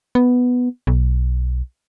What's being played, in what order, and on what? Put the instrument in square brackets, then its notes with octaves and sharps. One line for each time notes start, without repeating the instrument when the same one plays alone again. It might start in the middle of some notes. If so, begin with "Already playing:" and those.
[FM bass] B3
B1